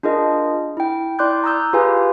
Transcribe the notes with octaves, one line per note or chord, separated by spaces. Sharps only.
D4 F4 G#4 A#4 D#5
E4 G5
E4 D5 C6 D6 F#6 G6
A#5 D#6 E6 G6
F4 G4 G#4 B4 F5 G#5